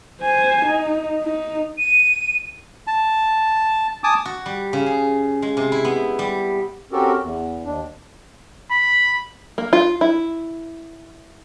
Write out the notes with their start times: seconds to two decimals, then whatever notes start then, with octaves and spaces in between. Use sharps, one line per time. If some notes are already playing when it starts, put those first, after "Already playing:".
0.21 C5 G#5
0.65 D#4
1.22 D#4
1.78 D#7
2.87 A5
4.04 G#5 A5 D6 D#6
4.25 F#4
4.46 G3
4.73 C#3
4.86 G#4
5.42 G#3
5.57 C3
5.72 E4
5.85 B3
6.19 G3
6.92 C4 C#4 F#4 G4 A4 A#4
7.21 E2
7.65 D#2 D4
8.71 B5
9.58 A#3
9.73 F4
10.01 E4